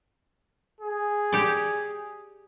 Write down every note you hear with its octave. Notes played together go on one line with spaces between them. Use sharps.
G#4
G4 D5